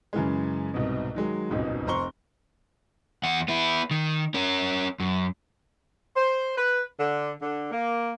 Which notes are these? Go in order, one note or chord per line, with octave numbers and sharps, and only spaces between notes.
F#2 C#3 E3 G#3
C2 G#2 B2
D#3 F#3 G#3
D#1 G#1 C#2 G#2 B2
F1 C4 A#5 C6 C#6 G7
E2 F#5
B3 E4
D#3
C#4 A#4
F#2
C5
B4
D3
D3
A#3